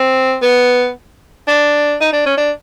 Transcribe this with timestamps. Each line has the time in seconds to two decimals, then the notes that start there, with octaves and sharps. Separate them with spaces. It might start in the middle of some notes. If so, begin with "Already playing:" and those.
Already playing: C4
0.42 B3
1.48 D4
2.01 D#4
2.13 D4
2.26 C#4
2.37 D4